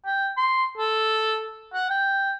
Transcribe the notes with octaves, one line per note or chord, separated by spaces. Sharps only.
G5
C6
A4
F#5
G5